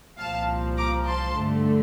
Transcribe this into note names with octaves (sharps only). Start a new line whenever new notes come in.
C2 A#2 F3 F5 A5
A#5 D6
A5 C6
G2 D3 A3